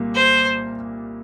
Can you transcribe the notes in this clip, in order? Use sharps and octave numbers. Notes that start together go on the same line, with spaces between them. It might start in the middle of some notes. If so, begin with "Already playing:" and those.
Already playing: C2 A#2 G3 A#3
C5